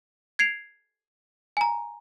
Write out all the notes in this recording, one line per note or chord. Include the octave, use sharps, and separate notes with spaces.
G#6 C7 D7 F7
G#5 A#5